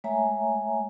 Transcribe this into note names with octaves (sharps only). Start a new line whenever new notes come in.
G#3 A3 C#5 E5 G#5 A#5